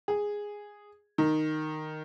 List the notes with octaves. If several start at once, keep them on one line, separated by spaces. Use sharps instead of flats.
G#4
D#3